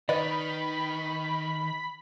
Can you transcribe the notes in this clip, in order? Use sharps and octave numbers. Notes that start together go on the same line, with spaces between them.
D#3 B4 D5 D#5 B5